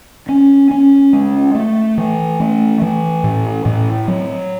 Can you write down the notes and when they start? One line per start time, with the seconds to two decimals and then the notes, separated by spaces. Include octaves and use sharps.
0.29 C#4
0.71 C#4
1.13 G#3
1.55 A3
1.98 E3
2.40 A3
2.82 E3
3.23 A2
3.65 A2
4.08 F#3